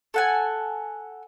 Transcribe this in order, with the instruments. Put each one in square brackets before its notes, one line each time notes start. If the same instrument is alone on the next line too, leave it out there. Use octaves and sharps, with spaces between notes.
[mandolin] A4 F#5 G#5